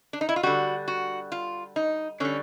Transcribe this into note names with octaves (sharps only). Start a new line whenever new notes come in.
D4
D#4
E4
F4
D3 G3 F#4
F#4
F4
D#4
D3 G3 C#4